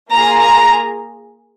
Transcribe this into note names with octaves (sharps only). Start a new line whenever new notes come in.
A#3 F4 G#4 A#5
A#5